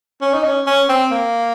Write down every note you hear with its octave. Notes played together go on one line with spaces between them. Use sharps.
C#4
D#4
C#4
C#4
C4
A#3